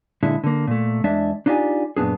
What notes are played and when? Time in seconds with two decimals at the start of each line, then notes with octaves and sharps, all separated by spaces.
0.23 A#2 D3 G#3 D4 E4
0.44 D3 A#3
0.67 A#2 A3
1.04 E2 G#3 D4 D5 E5
1.46 D4 D#4 F4 G4 D5 G#5
1.97 F#2 A#2 B3 D4 G#4